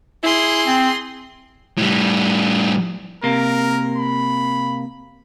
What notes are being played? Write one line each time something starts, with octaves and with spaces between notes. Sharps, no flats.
E4 G#4 C6
C4
A2 G3
C3 A#3 A#4
B5